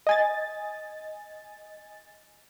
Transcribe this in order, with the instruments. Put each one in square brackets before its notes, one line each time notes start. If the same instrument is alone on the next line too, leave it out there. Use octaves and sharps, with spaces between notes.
[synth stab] D#5 G#5 A6